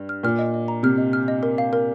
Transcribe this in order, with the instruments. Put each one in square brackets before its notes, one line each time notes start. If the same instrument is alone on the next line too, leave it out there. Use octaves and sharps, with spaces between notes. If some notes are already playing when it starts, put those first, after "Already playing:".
Already playing: [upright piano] G2
[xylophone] F6
[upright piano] A#2 [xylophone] F6
[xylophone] D#5
D#5
A#5
[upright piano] C3 [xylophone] F6
[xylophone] D#5
F6
D#5
A#4
F5
A#4